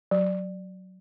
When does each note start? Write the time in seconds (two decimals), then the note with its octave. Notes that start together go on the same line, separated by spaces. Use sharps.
0.11 F#3